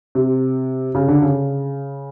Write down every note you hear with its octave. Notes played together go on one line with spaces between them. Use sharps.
C3
C#3
D3
C#3